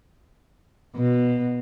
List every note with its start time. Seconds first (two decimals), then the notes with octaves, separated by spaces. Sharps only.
0.95 B2